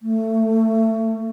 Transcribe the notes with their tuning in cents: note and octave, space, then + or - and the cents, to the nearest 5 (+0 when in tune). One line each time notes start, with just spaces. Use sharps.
A3 +20